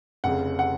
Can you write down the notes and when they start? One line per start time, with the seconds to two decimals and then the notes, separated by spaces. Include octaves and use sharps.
0.24 F1 F2 C#3 F#5
0.59 F#5